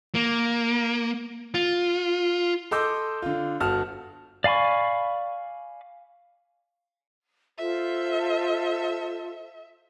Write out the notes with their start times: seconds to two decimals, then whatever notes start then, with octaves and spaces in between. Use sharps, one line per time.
0.15 A#3
1.54 F4
2.71 A4 D#5 C6 D6 E6 G6
3.22 D3 F4
3.60 G1 F#4 A5 F6
4.44 D5 F5 G#5 B5 C#6
7.58 F4 A4 C5 E5